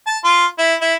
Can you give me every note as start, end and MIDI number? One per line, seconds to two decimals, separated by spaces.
0.07 0.18 81
0.24 0.46 65
0.58 0.74 64
0.81 0.94 64